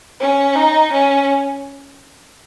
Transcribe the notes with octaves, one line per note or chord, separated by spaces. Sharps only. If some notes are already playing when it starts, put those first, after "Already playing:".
C#4
D#4
C#4